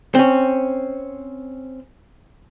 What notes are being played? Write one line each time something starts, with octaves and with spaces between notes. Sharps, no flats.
C4 C#4